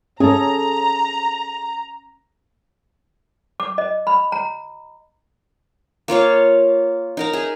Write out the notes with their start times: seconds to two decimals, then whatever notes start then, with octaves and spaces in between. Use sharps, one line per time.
0.20 C#4 G#4 A4 A#5
3.60 D6
3.78 D#5
4.07 B5
4.32 A#5
6.08 A#3 F4 C#5 F5
7.17 D#4 A#4 A#5
7.33 G#4 E5